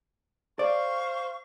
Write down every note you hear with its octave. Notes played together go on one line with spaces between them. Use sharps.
C5 D5 F5 C#6